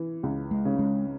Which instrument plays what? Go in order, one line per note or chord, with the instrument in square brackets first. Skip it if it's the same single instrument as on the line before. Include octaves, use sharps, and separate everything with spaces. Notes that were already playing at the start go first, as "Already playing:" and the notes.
Already playing: [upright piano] E3
C#2
[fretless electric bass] G#3
[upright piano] C#3
[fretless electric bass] G#3